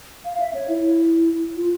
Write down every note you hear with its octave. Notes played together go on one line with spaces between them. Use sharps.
F5
E5
C#5
E4
F4